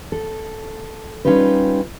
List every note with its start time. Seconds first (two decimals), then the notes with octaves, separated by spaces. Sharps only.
0.12 A4
1.25 G3 C#4 D#4 F4 G4 B4